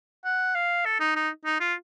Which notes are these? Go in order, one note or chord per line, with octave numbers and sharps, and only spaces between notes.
F#5
F5
A4
D#4
D#4
D#4
F4